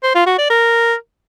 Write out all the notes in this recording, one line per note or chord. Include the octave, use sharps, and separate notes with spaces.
C5
F4
F#4
D5
A#4